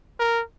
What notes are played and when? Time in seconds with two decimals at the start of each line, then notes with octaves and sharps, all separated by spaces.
0.20 A#4